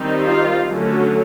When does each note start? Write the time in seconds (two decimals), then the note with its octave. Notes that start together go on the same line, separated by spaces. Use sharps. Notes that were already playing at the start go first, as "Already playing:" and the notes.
Already playing: D#3 G3 C4 D#4
0.25 F4
0.66 D3 F#3 A3 C#4